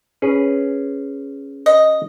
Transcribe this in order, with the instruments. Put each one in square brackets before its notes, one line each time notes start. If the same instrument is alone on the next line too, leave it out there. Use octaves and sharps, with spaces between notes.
[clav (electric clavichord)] C#4 G#4 B4
[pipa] D#5